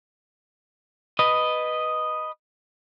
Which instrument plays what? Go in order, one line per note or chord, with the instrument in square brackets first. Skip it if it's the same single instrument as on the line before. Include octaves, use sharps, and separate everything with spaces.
[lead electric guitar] B4 D#5